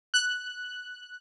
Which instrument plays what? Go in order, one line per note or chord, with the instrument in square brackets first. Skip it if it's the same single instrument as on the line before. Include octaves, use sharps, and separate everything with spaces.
[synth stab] F#6